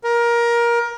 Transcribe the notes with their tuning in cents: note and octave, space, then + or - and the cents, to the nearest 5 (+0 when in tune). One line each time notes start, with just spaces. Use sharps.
A#4 +20